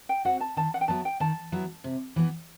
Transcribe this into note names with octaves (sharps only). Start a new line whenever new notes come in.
G5
C4 F#4 F#5
A5
D#3 A5
F#5
G5
F#3 B3 E4 A5
G5
D#3 A5
F#3 B3 E4
C3
E3 B3